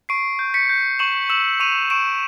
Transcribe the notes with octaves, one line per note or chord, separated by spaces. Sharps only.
C#6 C7 D7
G6
B6 C#7
G6
C#6 E7 F#7
E6 E7 F#7
C#6 D#7 F7
C#6 D7 E7